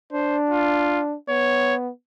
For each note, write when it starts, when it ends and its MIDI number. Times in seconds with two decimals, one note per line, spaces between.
0.13 1.16 62
0.13 0.37 72
0.50 1.01 65
1.29 1.90 59
1.29 1.75 73